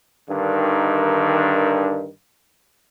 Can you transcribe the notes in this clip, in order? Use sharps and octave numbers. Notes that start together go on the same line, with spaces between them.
G2 D3 D#3